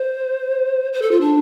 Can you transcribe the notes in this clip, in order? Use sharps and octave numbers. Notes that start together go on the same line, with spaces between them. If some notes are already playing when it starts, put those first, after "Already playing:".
Already playing: C5
C5
A4
F4
D4